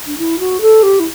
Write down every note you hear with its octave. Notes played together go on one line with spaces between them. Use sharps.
D4
E4
F#4
A4
G4
E4